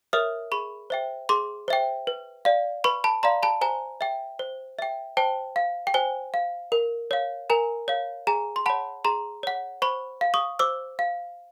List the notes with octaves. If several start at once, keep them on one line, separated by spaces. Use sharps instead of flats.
A#4 C#5 E5 D#6 F6
G#4 B5 C#6
C5 E5 G5
G#4 C6 D6
C5 E5 G5
B4
D5 F5
B4 B5 C#6
A5 B5
D5 F5 A#5 C6
A5 B5
C5 G#5 A#5
E5 G5
C5
E5 G5
C5 G5 A5
F5
G5
C5 G#5
F5
A#4
C#5 F5
A#4 G#5 A#5
C#5 F5
G#4 G#5 A#5
C6
C#5 F#5 A5 B5
G#4 A#5 C6
C#5 F#5
C5 B5 C#6
F5
C#6 D#6
C5 D6 E6
F5